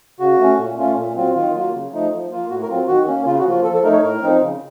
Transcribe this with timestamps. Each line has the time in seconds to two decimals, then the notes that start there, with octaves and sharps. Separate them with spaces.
0.20 C#3 F#4
0.39 A3 C#4
0.58 A#2
0.78 A3 C#4 F4
0.97 A#2
1.15 F#3 C4 F4
1.35 D#3 F4
1.54 F#3 A#3 F4
1.73 C#3
1.93 F3 A3 D#4
2.12 F3
2.31 A#3 F4
2.50 A2 F#4
2.63 A#4
2.69 F#3 C4 F4
2.88 D#3 F#4
3.07 A#3 C#4
3.26 C#3 F4
3.39 F#4
3.45 F3 A#3 F4
3.64 F3 A4
3.75 A4
3.83 A3 D#4 A#4
3.93 C#5
4.02 A2 A#4
4.22 F3 C4 D#4
4.41 C#3